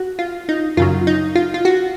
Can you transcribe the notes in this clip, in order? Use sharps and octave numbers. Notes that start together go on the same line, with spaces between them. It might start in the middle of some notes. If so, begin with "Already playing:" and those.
Already playing: F#4
F4
D#4
F#2 C#3 F#3 F4
D#4
F4
F4
F#4